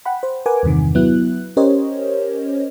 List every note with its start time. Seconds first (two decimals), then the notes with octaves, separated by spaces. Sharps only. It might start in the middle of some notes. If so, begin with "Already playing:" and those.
0.05 F#5 G5 B5
0.23 C5
0.46 A#4 B4 F#5 G#5 D6
0.63 E2 G2 C3 D#3
0.95 F#3 B3 E4 F#6
1.57 C#4 G4 A#4 C5 C#5 D#5